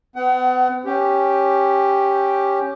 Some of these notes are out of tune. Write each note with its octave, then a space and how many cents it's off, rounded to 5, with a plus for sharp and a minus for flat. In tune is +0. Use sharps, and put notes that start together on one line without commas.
B3 +40 F#5 +30
C#4 +0 G4 +0